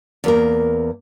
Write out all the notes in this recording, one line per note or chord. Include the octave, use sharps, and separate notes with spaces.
E2 A#3 A#4